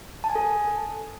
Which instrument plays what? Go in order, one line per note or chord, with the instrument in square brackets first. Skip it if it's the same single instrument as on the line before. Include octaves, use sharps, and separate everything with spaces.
[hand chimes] A5
G#5
A4